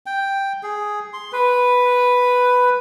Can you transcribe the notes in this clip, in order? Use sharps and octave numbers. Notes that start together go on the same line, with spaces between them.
G5
G#4
C6
B4